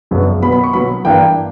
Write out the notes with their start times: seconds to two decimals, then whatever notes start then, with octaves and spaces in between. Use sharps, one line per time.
0.11 F#2 C#3 F#3 B3 D4
0.42 B2 F#3 B3 B5
0.52 B5
0.64 C#6
0.73 B2 F#3 B3 B5
1.05 G2 E3 A#3 D4 G5